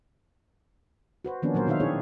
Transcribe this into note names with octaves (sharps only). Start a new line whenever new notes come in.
F#4 B4 C5
D#3 F3 A#3 B3 C#4 D4
A#2 F#3 A#3 A#4 C5
B2 D#3 D#4 C5 E5 F5
C4 D4 E4 G#4 C#5